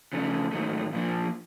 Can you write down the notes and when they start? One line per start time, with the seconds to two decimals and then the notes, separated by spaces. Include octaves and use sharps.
0.13 C#3 F3 A3 D4
0.53 G#2 D#3 F#3 A3
0.93 A#2 F3 A#3 D4